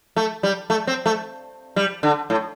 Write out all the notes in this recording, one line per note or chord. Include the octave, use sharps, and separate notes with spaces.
A3
G3
A3
C4
A3
G3
D3
A2